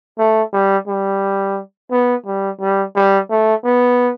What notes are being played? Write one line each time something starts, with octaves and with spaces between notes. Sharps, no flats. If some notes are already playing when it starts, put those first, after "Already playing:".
A3
G3
G3
B3
G3
G3
G3
A3
B3